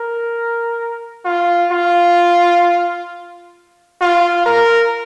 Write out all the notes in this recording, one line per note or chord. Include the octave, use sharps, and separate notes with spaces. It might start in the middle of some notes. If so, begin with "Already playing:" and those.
Already playing: A#4
F4
F4
F4
A#4